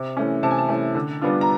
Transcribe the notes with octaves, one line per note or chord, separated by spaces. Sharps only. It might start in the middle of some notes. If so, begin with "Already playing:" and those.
Already playing: C3
E3 A3 C#4
C3 A5
G#5
A5
E3 A3 C#4
D3
G3 B3 D4 F4
A#5